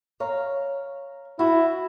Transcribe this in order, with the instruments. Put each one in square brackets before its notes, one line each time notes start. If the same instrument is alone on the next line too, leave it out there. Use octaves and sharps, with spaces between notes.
[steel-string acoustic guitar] C#5 F5 A#5
[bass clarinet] E4 [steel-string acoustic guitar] F#4